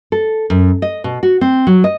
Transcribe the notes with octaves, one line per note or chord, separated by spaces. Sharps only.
A4
F#2
D#5
B2
F#4
C4
F#3
D#5